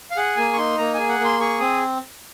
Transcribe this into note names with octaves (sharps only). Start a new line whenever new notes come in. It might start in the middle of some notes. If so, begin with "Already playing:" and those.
F5
G#4 F#5
A#3 G#5
C#6
D#4 C6
A#3 A#5
G#4 G#5
F#5
A#3
C6
G#4 C#6
C4 D#6